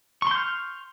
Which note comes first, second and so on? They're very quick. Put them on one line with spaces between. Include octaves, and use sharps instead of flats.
C#6 C6 G6 F6